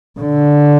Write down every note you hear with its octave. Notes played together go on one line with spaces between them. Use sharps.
D3